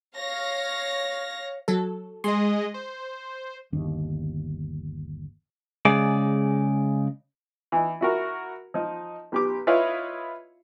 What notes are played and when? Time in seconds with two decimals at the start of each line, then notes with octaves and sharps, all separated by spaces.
0.15 C#5 F5 A#6
1.68 F#3 A4
2.24 G#3 D#5 C6
2.74 C5
3.73 G1 D#2 D4
5.85 C#3 G#3 D5
7.72 E3 D#4
8.01 E4 F#4 A#4
8.74 F3 D#4
9.32 B1 G4 D6
9.67 E4 F4 B4 C#5 D#5 F5